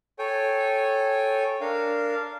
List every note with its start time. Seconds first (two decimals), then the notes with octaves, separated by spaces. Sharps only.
0.19 A4 C#5 G5 G#5
1.61 D4 A#4 F5